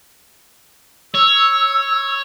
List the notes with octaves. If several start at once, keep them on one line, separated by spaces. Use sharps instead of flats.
C#5 E6